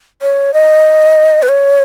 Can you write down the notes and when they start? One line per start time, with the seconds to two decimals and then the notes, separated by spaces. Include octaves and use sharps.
0.22 C#5
0.53 D#5
1.42 B4
1.48 C#5